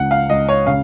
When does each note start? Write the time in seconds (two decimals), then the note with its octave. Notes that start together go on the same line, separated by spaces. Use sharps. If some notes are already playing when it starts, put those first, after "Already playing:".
Already playing: C#2 C#3 F#5
0.11 F5
0.29 C#2 D#5
0.49 C#5
0.67 C#3 F5